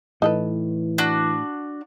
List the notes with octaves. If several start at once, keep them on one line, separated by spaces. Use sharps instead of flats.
A2 E3 D#4 A4 B4
D4 F#4